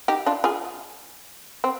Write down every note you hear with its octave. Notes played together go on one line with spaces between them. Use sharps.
D#4 G4
D4 F4
F4 G#4
C4